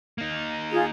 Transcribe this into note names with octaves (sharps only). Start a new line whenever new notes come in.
A#3 D#4
F4 G#4